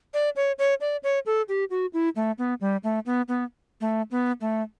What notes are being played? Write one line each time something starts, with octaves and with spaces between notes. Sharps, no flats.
D5
C#5
C#5
D5
C#5
A4
G4
F#4
E4
A3
B3
G3
A3
B3
B3
A3
B3
A3